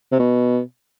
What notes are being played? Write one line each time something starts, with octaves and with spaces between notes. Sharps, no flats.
C3
B2